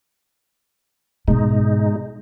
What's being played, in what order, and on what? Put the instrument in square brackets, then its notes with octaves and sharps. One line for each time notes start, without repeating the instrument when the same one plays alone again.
[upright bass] G#2 B2 [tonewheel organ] G#3 D#4